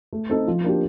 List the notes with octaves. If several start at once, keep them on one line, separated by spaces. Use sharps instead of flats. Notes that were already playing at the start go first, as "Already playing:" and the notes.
A3
C4 D#4 A4
F3
A#3 D4 G4